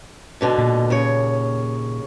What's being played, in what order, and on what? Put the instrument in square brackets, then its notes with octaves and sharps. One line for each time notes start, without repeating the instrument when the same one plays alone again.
[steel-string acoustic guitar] G#2 B2 D3
[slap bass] A#2
[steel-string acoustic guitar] D#2 C#3 C#5